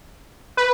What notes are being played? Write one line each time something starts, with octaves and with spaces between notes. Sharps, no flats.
B4